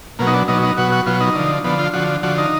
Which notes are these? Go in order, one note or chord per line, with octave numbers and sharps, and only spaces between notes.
B2 F#3 A#3
D#4
D4
B2 F#3 D#4
D#4
B2 F#3 F#4
F#4
B2 F#3 F4
D#4
D3 F3
D3 F3 B3
F4
D3 F3 F#4
D3 F3 F#4
D#4